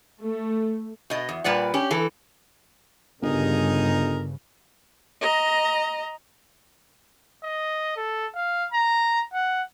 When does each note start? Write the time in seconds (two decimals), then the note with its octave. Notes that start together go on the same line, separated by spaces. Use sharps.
0.22 A3
1.10 B2 D#5
1.29 E2
1.44 A#2 G3 B4 D5 F#5
1.74 C#4 G4
1.91 E3 A4
3.22 G1 G2 C#3 D#4 G#4 A#4
5.21 D#5 A#5
7.44 D#5
7.96 A4
8.35 F5
8.72 A#5
9.33 F#5